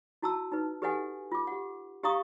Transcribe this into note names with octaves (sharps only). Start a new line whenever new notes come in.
E4 F#4 A5 A#5 E6
D#4 B4
G4 A4 B4 D#5 F#5 G#5
F4 D6
G4 F#5
G4 D#5 F5 A#5 C#6 D#6